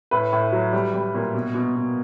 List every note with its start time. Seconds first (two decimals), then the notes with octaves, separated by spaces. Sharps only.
0.11 A2 B4
0.33 A2
0.52 F#3
0.73 G3
0.94 G3
1.15 A#2
1.35 B2
1.55 B2
1.76 B2